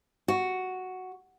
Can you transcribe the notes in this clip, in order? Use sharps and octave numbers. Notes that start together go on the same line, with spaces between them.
F#4